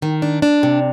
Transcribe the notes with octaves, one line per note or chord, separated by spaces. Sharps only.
D#3
D4
D4
C3